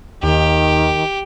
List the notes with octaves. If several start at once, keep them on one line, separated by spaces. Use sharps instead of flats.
D#2 D#3 G4